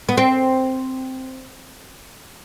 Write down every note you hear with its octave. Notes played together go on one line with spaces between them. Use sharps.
B3
C4